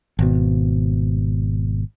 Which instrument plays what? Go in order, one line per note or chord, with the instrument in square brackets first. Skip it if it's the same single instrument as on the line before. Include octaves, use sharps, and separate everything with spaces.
[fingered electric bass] G#1 B2